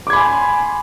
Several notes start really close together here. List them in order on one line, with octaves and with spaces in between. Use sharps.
D6 G#6 B5 G#5 C6